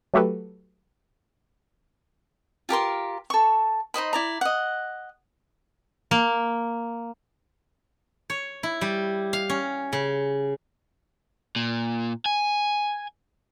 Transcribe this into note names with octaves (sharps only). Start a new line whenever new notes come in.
F#3 A3 F#4 G4 A4 B4
F4 G4 A#4 C6
A4 C#6
D#4 C5 D#5 B5
E4 D5 A#5
D#5 F#5
A#3
C#5
E4
G3
F5
C#4
C#3
A#2
G#5